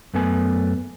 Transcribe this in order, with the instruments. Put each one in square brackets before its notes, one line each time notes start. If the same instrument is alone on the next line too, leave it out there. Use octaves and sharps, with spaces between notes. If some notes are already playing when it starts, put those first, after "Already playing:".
[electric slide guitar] F#2 A3 B3 G#5